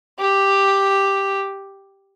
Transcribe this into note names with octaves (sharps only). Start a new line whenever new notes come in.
G4